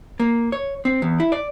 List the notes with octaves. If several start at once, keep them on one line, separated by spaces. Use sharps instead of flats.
A#3
C#5
C4
E2
E4
D5